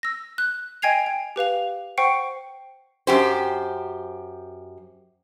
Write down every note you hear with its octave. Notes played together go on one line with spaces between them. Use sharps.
E6 A#6
F#6
D#5 G5 G#5 G#6 C7 F7
G5
G4 B4 F5 F7
C5 F#5 G5 C#6 C7 C#7
F#2 G4 C5